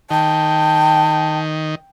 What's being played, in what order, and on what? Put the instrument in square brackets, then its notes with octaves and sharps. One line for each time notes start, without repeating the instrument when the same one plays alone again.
[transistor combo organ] D#3 [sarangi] G5 [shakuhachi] A5